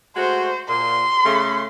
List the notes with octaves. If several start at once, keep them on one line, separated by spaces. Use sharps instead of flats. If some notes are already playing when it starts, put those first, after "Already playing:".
G#3 A3 F#4 C5
A#2 C6
C#3 A3